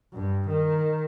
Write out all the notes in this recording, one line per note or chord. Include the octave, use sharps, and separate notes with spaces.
G2
D#3